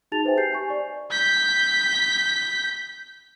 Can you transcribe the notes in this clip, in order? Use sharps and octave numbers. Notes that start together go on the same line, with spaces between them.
D#4 F#4 G#4 A5 A6 F7
B4 C5 E5 G5 G#5
G4 G6 C7
G#5 C#6
D5
G6 B6